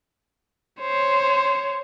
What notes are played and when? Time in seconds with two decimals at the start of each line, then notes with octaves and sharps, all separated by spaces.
0.81 C5 C#5